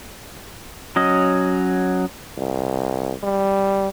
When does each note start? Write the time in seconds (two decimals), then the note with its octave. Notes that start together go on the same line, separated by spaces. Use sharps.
0.96 F#3 C#4 D#5
2.38 C2
3.23 G3